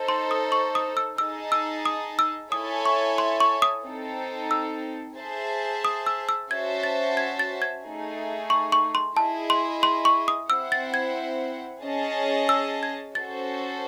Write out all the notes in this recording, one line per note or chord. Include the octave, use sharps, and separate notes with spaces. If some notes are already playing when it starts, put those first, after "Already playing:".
Already playing: D#4 A4 C5
C6
D#6
C#6
D#6
E6
D#4 G#4 D#5 A5 E6
E6
D#6
E6
E4 A4 C#5 E5 G#5 D#6
C#6
C6
C#6
D#6
C4 D#4 A4
E6
G#4 C5 E5 A5
D#6
E6
E6
C#4 F#4 C5 E5 A5 G#6
A6
G#6
A6
G#6
A3 D#4 G#4
C#6
C#6
C6
E4 G#4 D#5 A5
C6
C6
C#6
D#6
C4 E4 C5 F#5 E6
A6
G#6
C#4 G#4 D#5 A5
E6
G#6
C#4 F#4 A4 C5 A6